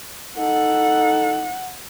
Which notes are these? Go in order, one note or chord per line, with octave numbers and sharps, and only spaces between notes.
D#4 A4 F#5